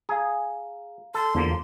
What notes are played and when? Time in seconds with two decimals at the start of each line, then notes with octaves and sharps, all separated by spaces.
0.09 G#4 F5 A#5
1.14 A4 C6
1.35 E2 D3 F3 A#3